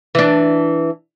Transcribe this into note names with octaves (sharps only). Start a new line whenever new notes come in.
E3 D4